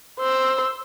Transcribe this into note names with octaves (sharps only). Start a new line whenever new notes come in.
C5 E6